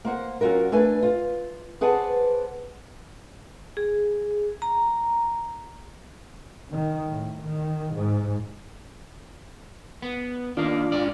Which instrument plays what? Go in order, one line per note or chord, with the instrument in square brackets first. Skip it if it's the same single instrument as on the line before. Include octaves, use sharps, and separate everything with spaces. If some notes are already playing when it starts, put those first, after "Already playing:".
[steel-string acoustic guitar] A#3 C5 F#5
F#3 C#4 F4 F#4 A#4
A3 D4 B4 G#5
F4
G#4 B4 C5 D5 F#5 A5
[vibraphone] G#4
A#5
[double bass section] D#3
A2
D#3
G#2
[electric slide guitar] B3
[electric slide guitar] D#3 A#3 [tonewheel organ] D4 F4
[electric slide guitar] G#2 D5